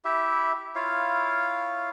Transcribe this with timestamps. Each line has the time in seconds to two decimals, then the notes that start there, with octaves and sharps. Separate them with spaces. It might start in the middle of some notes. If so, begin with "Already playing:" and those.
0.05 E4 G4 E5
0.75 E4 F4 C#5 F5